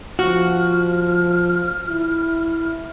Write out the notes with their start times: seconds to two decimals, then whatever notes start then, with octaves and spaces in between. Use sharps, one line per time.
0.19 F3 F#4 F6
1.89 E4